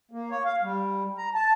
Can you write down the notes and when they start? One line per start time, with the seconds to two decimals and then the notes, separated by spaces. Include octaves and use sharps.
0.11 A#3
0.31 C#5
0.44 F5
0.63 G3
1.18 A#5
1.35 A5